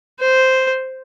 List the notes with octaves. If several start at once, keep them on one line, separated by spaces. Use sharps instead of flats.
C5